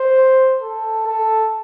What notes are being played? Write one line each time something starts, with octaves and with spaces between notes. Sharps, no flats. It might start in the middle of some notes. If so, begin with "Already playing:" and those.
Already playing: C5
A4
A4